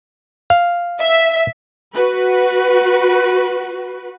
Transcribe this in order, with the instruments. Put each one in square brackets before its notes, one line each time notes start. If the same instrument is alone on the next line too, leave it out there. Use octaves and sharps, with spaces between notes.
[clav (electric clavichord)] F5
[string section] E5
[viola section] F#4 B4